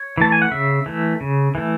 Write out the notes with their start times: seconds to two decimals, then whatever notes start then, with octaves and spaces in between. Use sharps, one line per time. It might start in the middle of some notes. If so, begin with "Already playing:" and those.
Already playing: C#5
0.18 E3 A3 A5
0.32 G#5
0.42 F#5
0.51 C#3 E5
0.86 E3 A3
1.21 C#3
1.55 E3 A3